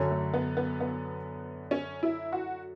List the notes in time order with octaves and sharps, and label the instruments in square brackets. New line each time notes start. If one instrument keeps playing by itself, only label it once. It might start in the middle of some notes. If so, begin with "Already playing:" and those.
Already playing: [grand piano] F#2 D3 F#3 C#4
[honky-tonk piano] A3
B3
B3
B3
C#4
E4
F#4